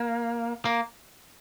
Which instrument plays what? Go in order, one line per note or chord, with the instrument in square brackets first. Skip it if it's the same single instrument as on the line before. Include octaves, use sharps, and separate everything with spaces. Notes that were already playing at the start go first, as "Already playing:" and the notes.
Already playing: [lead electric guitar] A#3
A#3